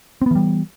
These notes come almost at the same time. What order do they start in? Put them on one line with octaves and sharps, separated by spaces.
C4 B3 E3 G3